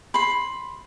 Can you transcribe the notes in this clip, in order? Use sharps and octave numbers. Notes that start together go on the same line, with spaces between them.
B5 C6